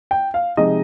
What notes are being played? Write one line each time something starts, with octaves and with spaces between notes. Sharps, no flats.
G5
F5
C3 F3 G#3 D#4 D#5